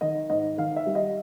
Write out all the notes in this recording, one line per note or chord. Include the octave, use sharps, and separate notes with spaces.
D#3 D#5
G#2 D#5
D#3 F5
E5
G3
D#5